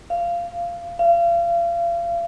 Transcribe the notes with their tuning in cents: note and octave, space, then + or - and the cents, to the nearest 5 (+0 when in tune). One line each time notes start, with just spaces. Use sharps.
F5 -20
F5 -35